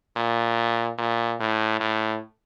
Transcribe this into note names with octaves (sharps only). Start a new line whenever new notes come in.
A#2
A#2
A2
A2